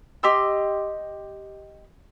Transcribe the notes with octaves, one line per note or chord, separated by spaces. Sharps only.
G4 D#5 C6 E6